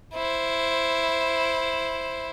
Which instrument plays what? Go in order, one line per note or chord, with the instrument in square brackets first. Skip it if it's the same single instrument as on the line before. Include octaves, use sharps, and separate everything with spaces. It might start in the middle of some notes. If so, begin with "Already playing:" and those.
[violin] E4 C5